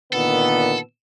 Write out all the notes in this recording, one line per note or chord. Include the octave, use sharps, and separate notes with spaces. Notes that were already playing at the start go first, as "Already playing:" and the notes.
A#2 D3 D#3 B3 A4